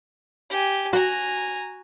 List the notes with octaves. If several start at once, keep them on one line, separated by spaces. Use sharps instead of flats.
G4 G#5
F#4 G#5 A#5